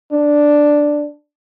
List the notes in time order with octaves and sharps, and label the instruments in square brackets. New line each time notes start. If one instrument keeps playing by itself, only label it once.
[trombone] D4